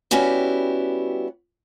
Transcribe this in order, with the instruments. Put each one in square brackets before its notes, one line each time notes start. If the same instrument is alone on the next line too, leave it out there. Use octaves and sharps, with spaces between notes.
[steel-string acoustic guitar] G3 B3 C#4 E4 F#4 G4